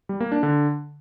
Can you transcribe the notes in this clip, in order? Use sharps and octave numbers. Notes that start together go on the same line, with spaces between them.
G3
A#3
D4
D3